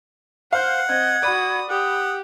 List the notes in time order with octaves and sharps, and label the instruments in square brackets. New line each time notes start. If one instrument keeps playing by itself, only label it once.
[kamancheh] C5 [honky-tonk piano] F5 G6 [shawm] F#5
[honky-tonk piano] C4 [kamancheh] D#5 [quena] G#6
[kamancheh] F#4 D#6 [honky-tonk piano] D5 B5
[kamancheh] G4 [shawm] F#5 [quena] D#6